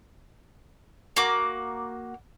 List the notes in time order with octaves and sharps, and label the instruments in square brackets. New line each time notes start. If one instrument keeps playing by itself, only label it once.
[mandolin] A#3 F#4 D6